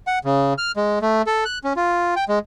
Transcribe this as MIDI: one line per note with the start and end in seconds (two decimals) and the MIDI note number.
0.07 0.19 78
0.25 0.53 49
0.58 0.72 89
0.77 0.99 56
1.02 1.22 57
1.27 1.44 69
1.45 1.59 90
1.64 1.73 61
1.76 2.15 65
2.16 2.24 79
2.29 2.39 56